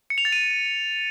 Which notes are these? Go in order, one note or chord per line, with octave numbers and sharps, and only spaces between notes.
C#7
F7
A6
D#7